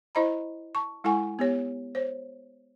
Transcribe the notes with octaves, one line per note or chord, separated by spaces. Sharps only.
E4 C5 D#5 A#5 B5
A5 C#6
G#3 E4 A4 F#5 G#5 C#6
B3 G4 C#5
C5 C#5